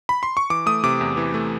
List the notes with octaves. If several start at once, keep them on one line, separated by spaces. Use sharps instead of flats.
B5
C6
C#6
E3 D6
A3 D#6
C3 D6
E2
E3
A3